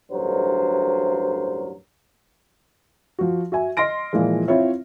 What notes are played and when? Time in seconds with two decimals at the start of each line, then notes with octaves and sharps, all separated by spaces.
0.12 A1 D2 G2 F#3 A#4 C5
3.19 F3 F#4
3.52 F#4 E5 G#5
3.77 D#5 C6 F6 A#6 D7
4.13 A#2 E3 F3 G#3
4.48 C4 E4 F4 C#5 E5